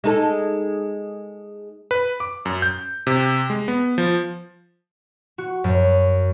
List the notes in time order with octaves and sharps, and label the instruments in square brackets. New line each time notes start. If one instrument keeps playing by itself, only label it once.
[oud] G#3 D#4 A4
[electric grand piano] B4
D6
F#2
G6
C3
G#3
B3
F3
[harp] F#4
F#2